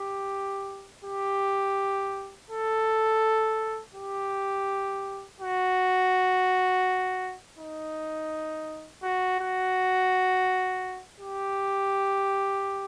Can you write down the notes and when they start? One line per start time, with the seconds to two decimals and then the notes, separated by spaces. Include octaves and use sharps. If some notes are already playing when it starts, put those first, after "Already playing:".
Already playing: G4
1.05 G4
2.51 A4
3.95 G4
5.41 F#4
7.59 D#4
9.03 F#4
9.40 F#4
11.20 G4